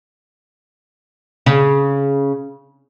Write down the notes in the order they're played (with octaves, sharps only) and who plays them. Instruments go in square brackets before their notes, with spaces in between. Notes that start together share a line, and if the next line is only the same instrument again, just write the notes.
[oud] C#3